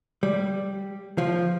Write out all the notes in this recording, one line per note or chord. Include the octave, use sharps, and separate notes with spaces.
G3
F3